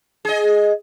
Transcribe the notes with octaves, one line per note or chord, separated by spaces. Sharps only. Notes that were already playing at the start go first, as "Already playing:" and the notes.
G#4 D#5